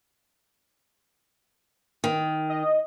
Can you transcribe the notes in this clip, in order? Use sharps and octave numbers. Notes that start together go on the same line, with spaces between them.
D#3
D#5